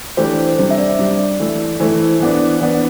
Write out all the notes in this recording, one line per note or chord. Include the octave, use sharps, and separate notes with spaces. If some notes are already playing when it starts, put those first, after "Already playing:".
E3 A3 D4 G4 C5
C3 G3 D4 G4 C5
E5
D5
C3 G3 D4 G4
E3 A3 E4
E3 A3 E4 C5
E3 B3 D4
E3 B3 D4 D5